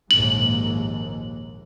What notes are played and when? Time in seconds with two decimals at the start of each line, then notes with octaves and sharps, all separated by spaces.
0.11 A#1 D#2 G#2 F#7